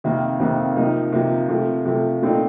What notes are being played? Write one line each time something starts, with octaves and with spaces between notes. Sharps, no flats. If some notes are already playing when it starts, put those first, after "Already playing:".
F2 C3 D#3 A#3
F2 C3 D#3 A#3
C3 F3 A#3 D#4
C3 F3 A#3 D#4
C3 F3 A3
C3 F3 A3
A#2 A3 C4 D#4